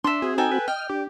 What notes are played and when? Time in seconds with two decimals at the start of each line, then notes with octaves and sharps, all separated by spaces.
0.04 D4 E5 C6
0.22 C4 F#4 G#4
0.38 D#4 A4 G5 G#5
0.51 B4
0.68 D#5 G5 F6
0.89 D4 G4